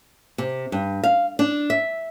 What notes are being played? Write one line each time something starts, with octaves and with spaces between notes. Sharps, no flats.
C3
G2
F5
D4
E5